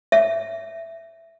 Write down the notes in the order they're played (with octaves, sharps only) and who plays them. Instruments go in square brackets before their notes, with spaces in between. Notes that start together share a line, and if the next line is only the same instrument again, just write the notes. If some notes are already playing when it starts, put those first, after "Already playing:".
[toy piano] E5